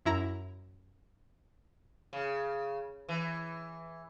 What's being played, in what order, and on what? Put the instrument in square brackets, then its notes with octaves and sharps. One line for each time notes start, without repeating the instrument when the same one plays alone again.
[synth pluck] F#2 E4 A#5
[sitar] C#3
E3